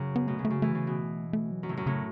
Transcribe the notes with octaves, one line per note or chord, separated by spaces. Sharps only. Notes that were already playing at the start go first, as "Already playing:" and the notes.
Already playing: F#2 C#3
B3
B2 A3
C#3
A3
C#3
E3 A3
C#3
B2
A3
F#3
F#2
A2 C#3
F#2
A2 C#3